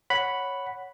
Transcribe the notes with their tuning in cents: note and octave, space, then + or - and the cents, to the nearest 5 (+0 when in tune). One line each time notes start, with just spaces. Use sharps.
C#5 +0 F#5 +0 B5 +0